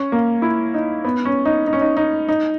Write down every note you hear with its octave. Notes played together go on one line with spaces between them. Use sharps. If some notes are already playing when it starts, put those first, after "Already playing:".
Already playing: C#4
A#3
E4
D#4
B3
C#4
D#4
D#4
C#4
D#4
D#4
D#4